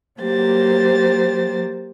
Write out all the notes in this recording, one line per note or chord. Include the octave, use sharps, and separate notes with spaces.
F#3 A#3 G4 C5 A6